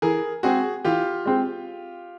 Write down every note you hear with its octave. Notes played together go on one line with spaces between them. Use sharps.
E3 G#4 A#4
G#3 C4 F#4 G#4
E3 F4 G4
G#3 C4